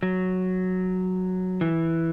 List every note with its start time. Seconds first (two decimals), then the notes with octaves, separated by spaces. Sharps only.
0.03 F#3
1.61 E3